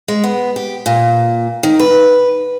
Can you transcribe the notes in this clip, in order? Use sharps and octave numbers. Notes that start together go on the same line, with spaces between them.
G#3
B3
G4
A#2
D#3
B4